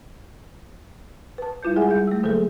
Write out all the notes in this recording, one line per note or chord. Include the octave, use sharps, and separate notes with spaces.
B4 A5
G3 E4 F4 B4 G6
G#3 G#4 E5 F#5 G#5
G3 G6
A3 E6
D3 F#3 A#3 G#4 A4